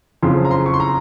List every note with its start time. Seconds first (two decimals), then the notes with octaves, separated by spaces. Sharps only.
0.22 F#1 F2 C#3 F3 C6
0.45 A#5
0.51 C6
0.66 C#6
0.74 C6
0.80 A#5